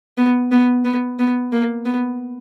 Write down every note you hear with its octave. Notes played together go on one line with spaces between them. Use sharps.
B3
B3
B3
B3
A#3
B3